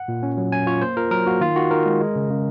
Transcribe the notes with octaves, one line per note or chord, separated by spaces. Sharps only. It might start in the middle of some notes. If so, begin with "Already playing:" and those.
Already playing: F#5
A#2
C#4
F#3
C#4 G#5
F4 C#5
A#3 C5
F4 A#4
F#3 A#4
A#3 F#4
D#3 F4
D#3 F#4
D#3 A#4
G#3
G#3
C#3
C#3